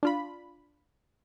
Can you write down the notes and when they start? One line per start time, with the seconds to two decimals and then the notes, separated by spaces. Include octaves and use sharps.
0.03 D4 F4 B5